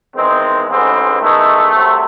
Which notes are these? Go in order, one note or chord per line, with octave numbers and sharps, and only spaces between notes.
E2 D#3 G#3 C4
A1 G#2 E3 G#3 C4
E2 D#3 G#3 A3
C2 C3 F#3